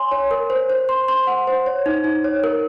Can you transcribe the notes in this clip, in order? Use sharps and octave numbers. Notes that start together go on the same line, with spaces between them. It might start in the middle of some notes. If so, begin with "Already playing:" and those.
Already playing: C#5 G#5 C6
C#5
A#4
C5
C5
C6
C6
F#5
C5
C#5
D#4
D#4
C#5
A#4